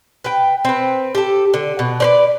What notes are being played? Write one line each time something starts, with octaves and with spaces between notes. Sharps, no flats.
B4 G5
C4 B4
G4 A4
D3
B2
B4 C5 D5